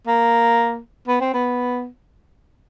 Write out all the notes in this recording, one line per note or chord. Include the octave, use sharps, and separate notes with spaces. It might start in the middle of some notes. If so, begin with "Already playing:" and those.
A#3
B3
C4
B3